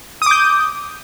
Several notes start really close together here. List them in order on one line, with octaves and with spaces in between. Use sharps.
D#6 D6 G6